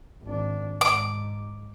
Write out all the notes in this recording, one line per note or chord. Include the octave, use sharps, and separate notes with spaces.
G#1 D4
G#2 D6